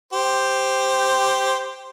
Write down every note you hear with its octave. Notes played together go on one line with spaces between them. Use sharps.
G4 C5